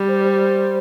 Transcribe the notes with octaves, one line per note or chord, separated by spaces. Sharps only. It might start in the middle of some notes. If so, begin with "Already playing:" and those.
Already playing: G3
C5
C5